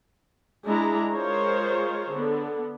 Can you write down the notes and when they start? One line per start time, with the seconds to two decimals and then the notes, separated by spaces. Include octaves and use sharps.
0.66 G#3 D4 E4 A#5
1.13 G#3 F4 G#4 A#4 C5 C#5
2.11 D3 B3